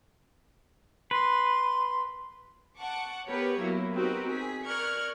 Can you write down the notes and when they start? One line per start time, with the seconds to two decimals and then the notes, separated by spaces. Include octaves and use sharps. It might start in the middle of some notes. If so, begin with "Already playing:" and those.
1.11 B4 C6
2.78 F#5 A5 C#6 D6
3.28 B3 G4 A#4 B4 C#5
3.60 F#3 A#3 B3 E4
3.93 C4 D#4 F#4 G4 A#4 B4
4.32 G#4 B6
4.67 A#4 D5 C#6 F6 F#6 G#6